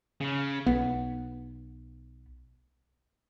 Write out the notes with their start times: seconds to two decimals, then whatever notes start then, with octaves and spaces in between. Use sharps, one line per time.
0.21 C#3
0.66 B1 B3